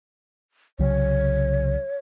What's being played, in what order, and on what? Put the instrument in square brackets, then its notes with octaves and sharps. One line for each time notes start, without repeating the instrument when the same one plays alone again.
[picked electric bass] C2 C#3 F#3 [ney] C#5